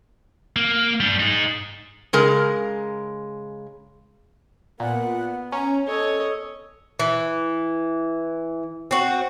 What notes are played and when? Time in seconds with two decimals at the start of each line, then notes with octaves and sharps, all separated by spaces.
0.56 A#3
1.00 G3 D4
1.20 D#4 G#4
2.13 C#3 G#3 A#4
4.80 A#2 B3 F#5
5.52 C#4 A#5
5.87 A4 C#5 D#5
7.00 E3
8.91 C4 F#4